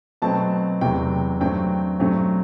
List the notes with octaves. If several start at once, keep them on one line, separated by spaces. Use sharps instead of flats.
B2 F#3 A3 C4 A5
E2 C3 F#3 A3 G5
G2 F#3 A3 C4 G5
G2 F#3 A3 C4